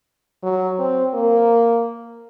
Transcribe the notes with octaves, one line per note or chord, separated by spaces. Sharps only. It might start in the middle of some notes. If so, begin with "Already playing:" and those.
F#3
C4
A#3